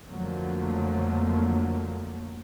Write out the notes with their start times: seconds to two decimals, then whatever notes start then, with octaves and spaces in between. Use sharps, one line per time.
0.10 F2 D3 F3 F#3 A3 A#3